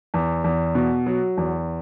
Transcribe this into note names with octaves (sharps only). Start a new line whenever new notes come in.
E2
E2
B2
F#3
E2